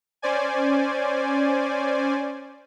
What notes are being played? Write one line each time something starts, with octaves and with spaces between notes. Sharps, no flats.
C#4 C5 D5 G#5